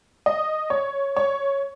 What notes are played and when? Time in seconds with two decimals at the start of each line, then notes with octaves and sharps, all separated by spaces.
0.26 D#5
0.70 C#5
1.16 C#5